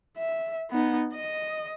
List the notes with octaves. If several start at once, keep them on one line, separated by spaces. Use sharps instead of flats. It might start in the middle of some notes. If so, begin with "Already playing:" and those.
E5
B3 D#4
D#5